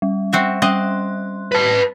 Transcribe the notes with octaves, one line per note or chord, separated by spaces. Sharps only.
G3
C4 F#4 E5
G3 C4 D#5 C6 F#6
B4 A5